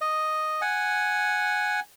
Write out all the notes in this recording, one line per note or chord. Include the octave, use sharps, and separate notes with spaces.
D#5
F#5 G#5